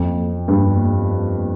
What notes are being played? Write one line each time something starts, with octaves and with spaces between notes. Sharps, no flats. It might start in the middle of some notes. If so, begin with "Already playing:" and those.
Already playing: F2
G2